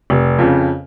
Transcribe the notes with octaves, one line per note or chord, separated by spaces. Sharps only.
F1
F2 C#3